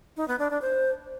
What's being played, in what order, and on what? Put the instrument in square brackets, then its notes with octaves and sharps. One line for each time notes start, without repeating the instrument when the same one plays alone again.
[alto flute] D#4
B3
D4
D4
C5